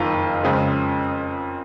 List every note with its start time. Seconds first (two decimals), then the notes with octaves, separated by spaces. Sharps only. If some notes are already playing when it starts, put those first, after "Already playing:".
Already playing: F#1 F2 D#3 F4
0.43 F2 C#3 F3 G#3